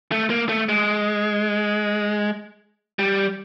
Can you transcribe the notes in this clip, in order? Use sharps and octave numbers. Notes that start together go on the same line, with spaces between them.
A3
A#3
A3
G#3
G3